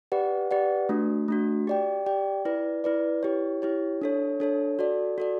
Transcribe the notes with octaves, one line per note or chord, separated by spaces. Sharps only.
G4 B4 D5 F#5
G4 B4 D5 F#5
A3 D4 F#4
A3 D4 F#4
G4 D5 G5
G4 D5 G5
E4 B4 D5
E4 B4 D5
E4 G4 C#5
E4 G4 C#5
D4 A4 C#5
D4 A4 C#5
F#4 A4 D5
F#4 A4 D5